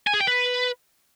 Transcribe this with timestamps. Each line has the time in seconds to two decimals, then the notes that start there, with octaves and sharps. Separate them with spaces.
0.07 G#5
0.14 G#4
0.21 G5
0.27 B4